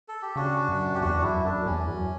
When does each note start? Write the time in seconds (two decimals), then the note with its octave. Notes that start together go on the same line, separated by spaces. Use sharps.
0.08 A4
0.22 G4
0.36 C#3 D4 F#4
0.68 F#2
0.95 G4
1.01 E2 D4 F#4
1.23 F#2 E4
1.44 F#2 D4
1.66 E2 C#4
1.88 F#2